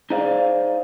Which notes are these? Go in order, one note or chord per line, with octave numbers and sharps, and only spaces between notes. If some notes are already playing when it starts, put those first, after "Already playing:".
D#4 G#4 C5 D5 F5